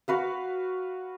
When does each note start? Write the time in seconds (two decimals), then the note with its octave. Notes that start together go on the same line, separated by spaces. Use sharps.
0.08 F#4 B4 F5